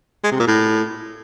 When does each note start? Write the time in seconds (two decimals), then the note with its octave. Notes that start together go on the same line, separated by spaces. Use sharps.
0.24 G#3
0.32 C3
0.39 A#2
0.47 A2